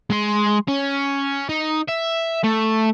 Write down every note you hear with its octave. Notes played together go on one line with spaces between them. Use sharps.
G#3 C6
C#4
D#4
E5
A3